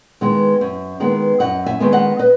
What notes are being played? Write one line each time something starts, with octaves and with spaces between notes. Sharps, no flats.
D#3 G#3 B3
F#2
D#3 G#3 B3
F#2 D#5 F#5
E5 G#5
D#3 G#3 B3
D#5 F#5
B4 D#5